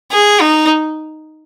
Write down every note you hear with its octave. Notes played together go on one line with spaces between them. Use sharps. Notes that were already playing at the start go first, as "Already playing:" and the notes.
G#4
D#4